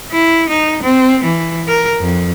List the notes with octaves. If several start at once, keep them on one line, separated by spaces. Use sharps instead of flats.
E4
D#4
C4
E3
A#4
F2